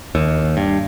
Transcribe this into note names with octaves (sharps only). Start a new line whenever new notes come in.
D#2
G2